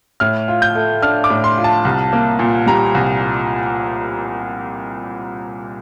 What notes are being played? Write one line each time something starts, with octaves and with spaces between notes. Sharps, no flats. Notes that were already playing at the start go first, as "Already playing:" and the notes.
A2 F6
F4
G6
A3
D4 F6
D6
A2
C6
F4
A5
C2
A#3
A#2
G3 A#5
C2